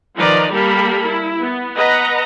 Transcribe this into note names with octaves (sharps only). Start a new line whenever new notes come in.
D#3 F3 B4 D5 D#5 A#5
G3 A#3 G4 A4 A#4 B5
E4
B3
B4 D#5 F#5 A#5